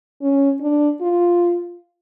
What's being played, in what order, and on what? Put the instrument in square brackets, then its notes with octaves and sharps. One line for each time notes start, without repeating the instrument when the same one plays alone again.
[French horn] C#4
D4
F4